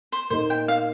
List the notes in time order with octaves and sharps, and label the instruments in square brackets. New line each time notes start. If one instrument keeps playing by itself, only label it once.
[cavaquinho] C5
[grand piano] A#2 A#3 D#4 [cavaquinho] C5
[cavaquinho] G5
F5